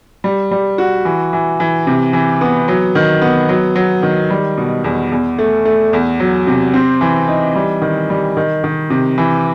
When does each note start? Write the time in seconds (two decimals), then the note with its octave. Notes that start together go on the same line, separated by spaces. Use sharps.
0.24 G3
0.51 G3
0.78 F#4
1.05 E3
1.33 E3
1.60 E3
1.87 C3
2.13 E3
2.41 B3
2.68 F#3
2.95 D#3
3.22 B3
3.49 F#3
3.76 F#3
4.03 D#3
4.30 G3
4.57 B2
4.84 E2
5.12 E2
5.38 A3
5.65 A3
5.93 E2
6.20 F#3
6.47 C3
6.74 C4
7.01 E3
7.28 D#4
7.55 G3
7.82 D#3
8.10 G3
8.37 D#3
8.64 D#3
8.90 C3
9.18 E3